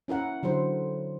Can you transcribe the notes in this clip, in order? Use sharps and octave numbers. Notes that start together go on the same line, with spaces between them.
C#4 E4 A#4 F#5
D3 F#3 E4 C5